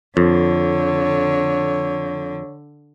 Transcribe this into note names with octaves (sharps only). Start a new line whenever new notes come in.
F2 D3 C#5